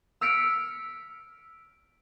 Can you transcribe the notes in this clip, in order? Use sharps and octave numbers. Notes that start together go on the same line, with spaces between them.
E6 F6 B6 C#7 D7